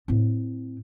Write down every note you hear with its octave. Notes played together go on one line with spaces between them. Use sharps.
A2 C4